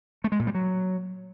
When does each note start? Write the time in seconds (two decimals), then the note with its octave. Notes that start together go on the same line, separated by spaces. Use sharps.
0.24 A3
0.32 G#3
0.39 A#2
0.47 G3
0.55 F#3